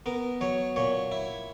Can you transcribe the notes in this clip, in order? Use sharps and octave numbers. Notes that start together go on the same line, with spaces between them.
B3 A#4
F#3 C#5
A#2 C#5
E4